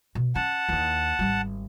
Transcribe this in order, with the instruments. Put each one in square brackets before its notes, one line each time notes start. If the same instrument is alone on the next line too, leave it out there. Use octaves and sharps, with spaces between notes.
[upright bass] B2
[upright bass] C#4 [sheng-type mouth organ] F#5 A5
[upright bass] D#2 E4
G#1 G3